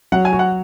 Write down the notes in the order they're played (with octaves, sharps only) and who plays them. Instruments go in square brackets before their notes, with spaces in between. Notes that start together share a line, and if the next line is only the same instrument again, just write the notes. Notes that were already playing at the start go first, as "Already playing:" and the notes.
[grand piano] F#3 [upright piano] F#5
[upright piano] G#5
[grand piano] F#4
[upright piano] F#5